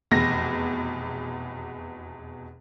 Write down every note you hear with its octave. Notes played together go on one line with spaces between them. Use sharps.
F1 E2 B2 A#6